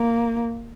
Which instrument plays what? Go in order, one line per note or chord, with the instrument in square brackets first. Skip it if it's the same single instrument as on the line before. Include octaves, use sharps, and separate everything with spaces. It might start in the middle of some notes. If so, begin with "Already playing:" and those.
Already playing: [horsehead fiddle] A#3